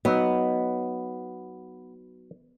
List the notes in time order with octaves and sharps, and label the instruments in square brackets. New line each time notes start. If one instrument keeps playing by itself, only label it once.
[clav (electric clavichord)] F#3 D#4 [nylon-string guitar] B3